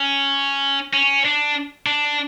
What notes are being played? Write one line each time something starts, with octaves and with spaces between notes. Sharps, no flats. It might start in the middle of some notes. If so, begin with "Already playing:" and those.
Already playing: C#4
C#4
D4
D4